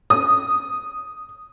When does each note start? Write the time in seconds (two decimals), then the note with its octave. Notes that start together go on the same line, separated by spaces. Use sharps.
0.10 D#6